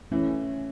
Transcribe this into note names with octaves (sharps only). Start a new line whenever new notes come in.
E3 A3 C#4